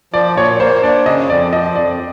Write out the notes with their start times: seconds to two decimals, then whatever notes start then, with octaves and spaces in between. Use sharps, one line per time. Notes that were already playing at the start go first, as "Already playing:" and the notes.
0.13 F3 D5
0.36 A#2 C#5
0.60 A#3 C5
0.83 D4 D5
1.06 C#3 D#5
1.29 F2 D5
1.53 F3 D#5
1.75 F2 D5